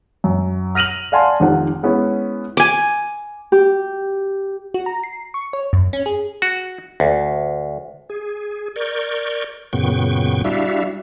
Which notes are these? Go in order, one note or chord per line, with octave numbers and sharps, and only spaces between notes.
F#2
F6 A#6 D#7 F7 F#7
D5 F5 F#5 G#5 A5 C6
F1 D#3 F3 F#5
G#3 B3 C#4 E4
G#5 D6
G4
F#4
A#5
C7
C#6
C#5
F#2
C#4
G#4
F#4
D2
G#4
A#4 D5 C#6 G6
F#2 A#2 C#3 B3 G5 C#6
G3 D4 E4 F#4 E5 F5